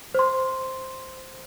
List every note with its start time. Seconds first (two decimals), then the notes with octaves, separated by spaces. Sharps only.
0.15 C5 C6